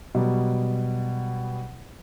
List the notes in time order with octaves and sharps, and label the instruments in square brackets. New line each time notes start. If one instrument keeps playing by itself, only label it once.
[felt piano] B2 F#3 G3